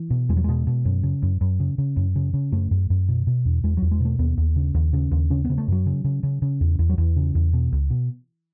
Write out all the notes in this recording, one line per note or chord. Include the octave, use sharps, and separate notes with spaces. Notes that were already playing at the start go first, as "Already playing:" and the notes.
Already playing: E3
B2
E2 G#3
F#3
B2 G#3
B2
F#2
C#3
F#2
F#2
C#3
C#3
F#2
C#3
C#3
F#2 A3
F#2
F#2
B2
B2
E2
E2 G#3
E2 F#3
G#3
B2 A3
D#2 B3
D#2
C#3
D#2
C#3
D#2
C#3 C#4
C#3 B3
A3
F#2 F#3
C#3
C#3
C#3
C#3
E2
E2
F#3
E2 E3
C#3
E2
B2
C#2
B2